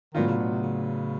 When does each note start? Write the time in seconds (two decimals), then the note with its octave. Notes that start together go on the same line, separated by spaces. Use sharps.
0.14 A2 D#3 F#3 B3 D4 F4
0.27 C#3
0.39 B2
0.51 C3
0.62 C#3